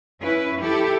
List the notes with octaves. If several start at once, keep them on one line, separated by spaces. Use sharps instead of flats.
C#4 E4 B4
E4 G4 A4